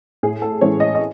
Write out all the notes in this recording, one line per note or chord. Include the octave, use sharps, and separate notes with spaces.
A2 G#4
A4
E3 G#3 C#4 C#5
D#5
D#5